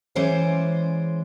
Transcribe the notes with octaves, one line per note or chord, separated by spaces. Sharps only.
E3 G#3 C#4 C5 D5